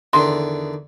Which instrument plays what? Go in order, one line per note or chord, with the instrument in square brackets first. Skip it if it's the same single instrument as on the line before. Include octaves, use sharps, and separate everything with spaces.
[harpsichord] E2 D3 D#3 [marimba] C6